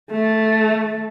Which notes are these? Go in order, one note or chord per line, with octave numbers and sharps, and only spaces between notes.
A3